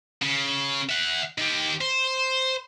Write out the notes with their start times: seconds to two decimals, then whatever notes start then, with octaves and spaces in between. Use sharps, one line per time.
0.22 C#3
0.89 E5 F#5
1.38 D#3 G4
1.81 C5